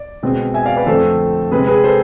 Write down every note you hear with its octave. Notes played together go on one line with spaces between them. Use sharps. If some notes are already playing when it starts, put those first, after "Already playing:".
Already playing: D5
B2 G#3 C4
E5 G#5
D5 F5
B4 D5
F2 D3 A3 C4 A4 C5
C3 G#3 C4 G#4 B4
G#4 B4
A4 C5